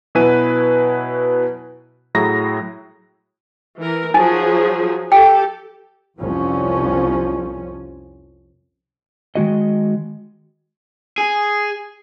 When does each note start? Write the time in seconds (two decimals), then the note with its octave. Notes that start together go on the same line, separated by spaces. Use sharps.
0.15 B2 F#3 E4 B4 G#5 D#7
2.15 A2 F#3 E4 G#4 A#5 A#6
3.79 E3 A#4
4.14 F3 F#3 D#4 G#4 G#5
5.12 G4 A4 G5
6.17 C2 F2 F3 C#4
9.35 D#3 G#3 F#4 D#5
11.18 G#4